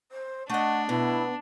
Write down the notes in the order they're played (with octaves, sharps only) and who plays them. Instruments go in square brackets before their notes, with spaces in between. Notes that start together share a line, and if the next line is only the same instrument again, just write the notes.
[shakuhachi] C5
[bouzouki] A3 D#5 [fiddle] D4 [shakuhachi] F#5
[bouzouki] B2 [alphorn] B3 [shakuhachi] E4